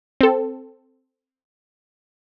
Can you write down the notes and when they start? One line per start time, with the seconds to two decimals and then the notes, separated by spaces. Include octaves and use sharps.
0.21 C4 A4